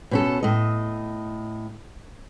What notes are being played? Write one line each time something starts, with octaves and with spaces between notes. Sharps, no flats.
B2 C#4 A4
A2 D#5